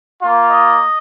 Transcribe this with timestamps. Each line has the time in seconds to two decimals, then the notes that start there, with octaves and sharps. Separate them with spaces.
0.21 A#3 F4
0.51 D#5